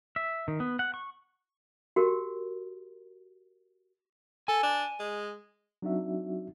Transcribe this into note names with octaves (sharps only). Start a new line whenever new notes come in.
E5
D#3
B3
F#5
C#6
F#4 G4 A#4
A4 G#5
D4
G#3
F#3 C4 D4 D#4 F#4 E5